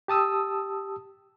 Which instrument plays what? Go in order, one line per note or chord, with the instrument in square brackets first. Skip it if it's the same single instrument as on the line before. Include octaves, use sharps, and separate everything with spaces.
[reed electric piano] G4 A5 D#6 E6